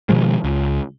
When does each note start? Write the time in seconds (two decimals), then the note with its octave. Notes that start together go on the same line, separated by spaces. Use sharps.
0.09 B2 D#3 F3 G#3
0.44 C#2